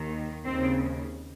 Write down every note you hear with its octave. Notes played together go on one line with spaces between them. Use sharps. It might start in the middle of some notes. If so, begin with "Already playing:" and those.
Already playing: D#2 D#3
D#2 C#3 C4